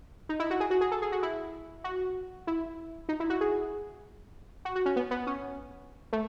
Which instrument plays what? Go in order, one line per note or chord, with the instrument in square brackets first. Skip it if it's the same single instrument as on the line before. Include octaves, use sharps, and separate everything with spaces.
[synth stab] D#4
E4
F#4
G#4
F#4
G#4
A4
G#4
F#4
E4
F#4
E4
D#4
E4
F#4
G#4
F#4
F#4
C#4
B3
B3
C#4
A3